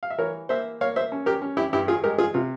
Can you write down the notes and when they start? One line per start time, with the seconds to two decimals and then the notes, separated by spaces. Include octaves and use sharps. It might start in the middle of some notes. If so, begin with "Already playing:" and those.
0.03 F5
0.10 E5
0.18 E3 A#4 C#5
0.49 A#3 C5 E5
0.81 A#3 C#5 F5
0.96 C5 E5
1.12 C#4
1.26 G4 A#4
1.42 C#4
1.57 E4 G4
1.73 G2 E4 G4
1.88 F4 G#4
2.04 G#3 G4 A#4
2.18 F4 G#4
2.34 C3 F4